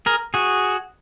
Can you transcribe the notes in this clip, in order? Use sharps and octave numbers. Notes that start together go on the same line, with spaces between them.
G#4 A#4
F#4 G#4